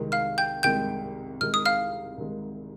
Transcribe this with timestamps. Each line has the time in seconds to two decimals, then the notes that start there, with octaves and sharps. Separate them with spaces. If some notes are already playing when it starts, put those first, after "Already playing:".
Already playing: C2 C3 D#3 G#3
0.12 F5 F6
0.38 G5 G6
0.63 C2 C3 D#3 G#3 G5 G6
1.41 C2 C3 D#3 G#3 F6
1.54 D#6
1.66 F5 F6
2.18 C2 C3 D#3 G#3